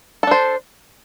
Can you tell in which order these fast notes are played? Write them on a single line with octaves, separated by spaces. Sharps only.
A4 D4 C5